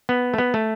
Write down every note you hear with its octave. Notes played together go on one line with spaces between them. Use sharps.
B3
A3
B3
A3